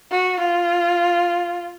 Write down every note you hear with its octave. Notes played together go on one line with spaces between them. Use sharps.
F#4
F4